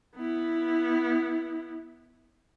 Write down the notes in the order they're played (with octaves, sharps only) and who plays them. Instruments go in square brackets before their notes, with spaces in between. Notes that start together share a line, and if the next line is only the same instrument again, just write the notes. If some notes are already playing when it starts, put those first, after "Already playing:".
[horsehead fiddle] B3 E4